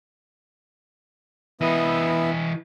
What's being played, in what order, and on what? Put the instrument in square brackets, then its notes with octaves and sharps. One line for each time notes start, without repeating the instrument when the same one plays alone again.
[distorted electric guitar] E3 D#5 [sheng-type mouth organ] B3 E4 E5